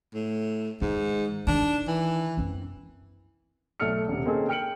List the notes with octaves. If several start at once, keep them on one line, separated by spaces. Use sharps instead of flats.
A2
G#2 D#3
D#3 D4
E3
F#2 C4
B1 A3 A4 D5 F6 C#7
D#1 C3
A#3 C4 C#4 D#4 G#4 A4
G5 F6 C#7 D7 F#7